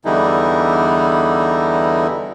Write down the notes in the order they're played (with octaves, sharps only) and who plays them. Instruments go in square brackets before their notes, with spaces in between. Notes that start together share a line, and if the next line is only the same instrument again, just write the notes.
[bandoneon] E2 D3 E3 G3 D#4 E4